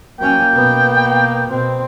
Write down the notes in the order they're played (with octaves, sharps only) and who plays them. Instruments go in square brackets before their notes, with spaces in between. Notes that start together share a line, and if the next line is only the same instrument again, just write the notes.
[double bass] F#3 C#4 [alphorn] A#3 [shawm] G5
[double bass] B2 B3
B2 C4